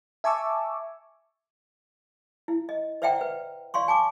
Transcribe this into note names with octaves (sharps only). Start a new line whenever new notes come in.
E5 G#5 A5 C#6 D6 E6
E4
D#5
C5 D5 E5 F#5 G5 A#5
B4
D5 F5 C6 C#6
G#5 A5 D6